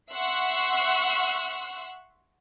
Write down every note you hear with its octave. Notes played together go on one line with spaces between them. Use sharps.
E5 F#5 C6 C#6 E6 F#6